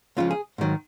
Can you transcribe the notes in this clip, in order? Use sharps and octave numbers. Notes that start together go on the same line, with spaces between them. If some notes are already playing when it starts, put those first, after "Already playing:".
C#2 C#3 F3 F4
G#4
G#2 D#3 F#3